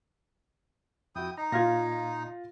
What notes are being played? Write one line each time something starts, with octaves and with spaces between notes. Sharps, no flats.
F2 E4 F#4 G5 D#6
D#4 A#5
A#2 F4 F5 G#6 A#6